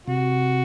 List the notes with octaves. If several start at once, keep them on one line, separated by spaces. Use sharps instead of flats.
C3 F#4